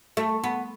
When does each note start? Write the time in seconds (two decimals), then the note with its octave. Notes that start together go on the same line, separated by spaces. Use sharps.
0.17 A3
0.44 B3